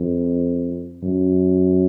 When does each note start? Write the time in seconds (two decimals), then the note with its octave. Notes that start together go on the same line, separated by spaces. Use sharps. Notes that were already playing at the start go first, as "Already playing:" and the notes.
Already playing: F2
1.03 F#2